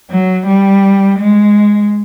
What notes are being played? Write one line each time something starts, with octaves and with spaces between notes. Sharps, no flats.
F#3
G3
G#3